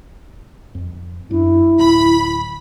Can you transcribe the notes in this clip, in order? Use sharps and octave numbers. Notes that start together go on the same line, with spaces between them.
F2
F#2 D4 E4
D1 B5